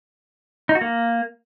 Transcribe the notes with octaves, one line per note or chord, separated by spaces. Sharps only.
D#4
F#4
A#3